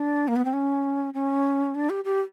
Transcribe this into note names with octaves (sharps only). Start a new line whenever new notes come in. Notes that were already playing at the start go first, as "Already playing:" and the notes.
Already playing: D4
A#3
B3
C4
C#4
C#4
D4
G4
G4